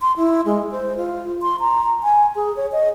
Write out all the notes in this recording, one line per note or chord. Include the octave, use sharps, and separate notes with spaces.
C6
E4
G#3
C5
F4
C6
A#5
G#5
G#4
C#5
D#5